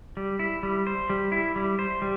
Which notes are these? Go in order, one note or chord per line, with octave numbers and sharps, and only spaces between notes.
G3
E4
G3
C5
G3
E4
G3
C5
G3